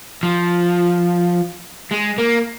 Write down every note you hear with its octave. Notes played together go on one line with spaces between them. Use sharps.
F3
G#3
A#3